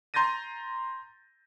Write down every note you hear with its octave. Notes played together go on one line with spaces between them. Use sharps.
A#5 C6 G6 A6 A#6 D#7